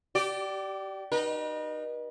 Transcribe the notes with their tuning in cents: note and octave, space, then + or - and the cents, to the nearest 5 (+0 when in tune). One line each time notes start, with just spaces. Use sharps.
G4 -30 D5 +0
D#4 -20 B4 -45